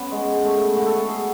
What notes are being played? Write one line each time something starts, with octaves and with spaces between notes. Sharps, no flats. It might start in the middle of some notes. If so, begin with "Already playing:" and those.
Already playing: B3 C#4
G#3
A3
F#4
A4
G#4
G#4